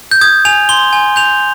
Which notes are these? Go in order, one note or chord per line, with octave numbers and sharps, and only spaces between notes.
G6
D#6 G#6
G#5 F7
C6 G7
G#5
G6 F7